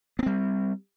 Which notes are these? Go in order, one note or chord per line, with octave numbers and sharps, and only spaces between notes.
G3 B3 C4